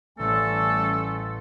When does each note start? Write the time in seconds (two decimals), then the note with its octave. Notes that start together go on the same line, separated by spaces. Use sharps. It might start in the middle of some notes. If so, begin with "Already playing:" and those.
0.19 A1 G3 A3 C#4 A4